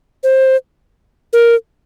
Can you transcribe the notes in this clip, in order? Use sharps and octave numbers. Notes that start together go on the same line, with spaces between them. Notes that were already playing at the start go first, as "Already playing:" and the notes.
C5
A#4